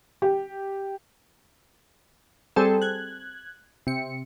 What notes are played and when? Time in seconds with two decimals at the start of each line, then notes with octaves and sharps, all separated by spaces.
0.22 G4
2.56 G3 C4 G#4 A4
2.82 F#6 G#6
3.87 C3 C#7